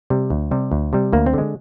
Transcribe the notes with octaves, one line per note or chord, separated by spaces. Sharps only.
C3 G3
D2
C3 G3
D2
C3 G3
D2 A#3
C4
D3 G#3